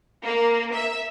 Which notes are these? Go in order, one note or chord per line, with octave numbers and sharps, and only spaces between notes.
A#3
E5